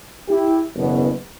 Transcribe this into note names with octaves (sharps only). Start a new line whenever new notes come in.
E4 G4
F#1 E2 B2